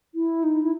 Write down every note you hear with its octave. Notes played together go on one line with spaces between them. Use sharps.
E4
D#4
E4